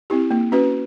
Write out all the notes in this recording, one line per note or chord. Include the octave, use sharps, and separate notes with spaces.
C4 E4 G4
A#3
C#4 F#4 B4